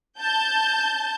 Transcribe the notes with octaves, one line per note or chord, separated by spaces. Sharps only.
A5 G6